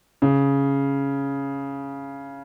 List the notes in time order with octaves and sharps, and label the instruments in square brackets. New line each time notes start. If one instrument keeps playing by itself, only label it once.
[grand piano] C#3